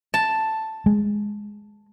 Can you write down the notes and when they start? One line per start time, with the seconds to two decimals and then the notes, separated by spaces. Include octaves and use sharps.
0.14 A5
0.86 G#3